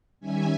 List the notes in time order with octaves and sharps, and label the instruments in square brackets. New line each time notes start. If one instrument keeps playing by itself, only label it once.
[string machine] D#3 G3 C#4 E5 G#5